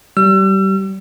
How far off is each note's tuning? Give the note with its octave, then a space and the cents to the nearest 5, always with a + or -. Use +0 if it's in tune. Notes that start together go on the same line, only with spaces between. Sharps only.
G3 -30 E6 +40